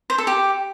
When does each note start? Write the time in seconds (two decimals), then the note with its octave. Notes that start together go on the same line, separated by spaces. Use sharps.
0.10 C5
0.18 A4
0.27 G4